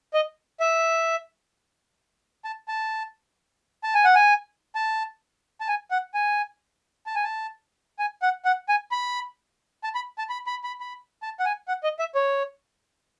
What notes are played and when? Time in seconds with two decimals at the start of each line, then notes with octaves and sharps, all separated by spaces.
0.14 D#5
0.60 E5
2.45 A5
2.68 A5
3.84 A5
3.94 G#5
4.04 F#5
4.15 G#5
4.75 A5
5.61 A5
5.68 G#5
5.91 F#5
6.14 G#5
7.07 A5
7.15 G#5
7.24 A5
7.99 G#5
8.22 F#5
8.45 F#5
8.69 G#5
8.92 B5
9.84 A5
9.95 B5
10.18 A5
10.30 B5
10.47 B5
10.64 B5
10.80 B5
11.22 A5
11.40 F#5
11.45 G#5
11.68 F#5
11.84 D#5
11.99 E5
12.15 C#5